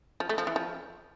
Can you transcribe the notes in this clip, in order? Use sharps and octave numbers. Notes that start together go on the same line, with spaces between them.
F3
A3
F3
E3
F3